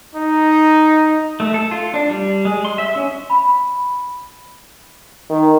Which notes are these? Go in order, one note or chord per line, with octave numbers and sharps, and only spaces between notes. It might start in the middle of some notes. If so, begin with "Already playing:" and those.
D#4
A3
A4
F4
D4
G3
G#3
C6
E5
C#4
B5
D#3